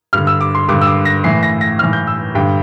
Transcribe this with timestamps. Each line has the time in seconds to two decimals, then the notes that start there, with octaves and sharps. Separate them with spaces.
0.13 G2 D3 F6
0.27 E6
0.41 D6
0.55 C6
0.69 G2 D3 D6
0.81 E6
0.87 D6
1.05 A#6
1.24 A2 E3 C7
1.43 A#6
1.61 A#6
1.79 A2 E3 F6
1.93 G6
2.07 E6
2.35 G2 D3 G5